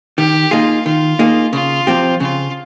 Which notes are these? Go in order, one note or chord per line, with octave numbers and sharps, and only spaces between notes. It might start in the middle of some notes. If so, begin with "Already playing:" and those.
D#3 G4
A#3 D#4 F4 G#4
D#3 F4
A#3 D#4 G#4
C#3 F4
F3 C4 G4
C#3 F4